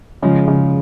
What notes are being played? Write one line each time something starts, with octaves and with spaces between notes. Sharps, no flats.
C#3 F3 G#3
C#3